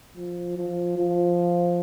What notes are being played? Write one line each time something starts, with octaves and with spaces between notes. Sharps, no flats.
F3
F3
F3